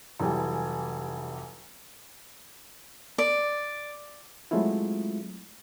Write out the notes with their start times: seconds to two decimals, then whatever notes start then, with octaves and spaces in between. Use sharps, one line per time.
0.20 F1 E3 F#3 G3 G#5
3.18 D5
4.51 F#3 G#3 A3 C4 E4 F4